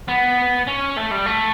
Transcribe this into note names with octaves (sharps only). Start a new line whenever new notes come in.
B3
C#4
A3
G3
A3